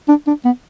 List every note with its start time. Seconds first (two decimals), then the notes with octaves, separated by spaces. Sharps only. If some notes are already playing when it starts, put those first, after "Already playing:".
0.08 D4
0.27 D4
0.45 B3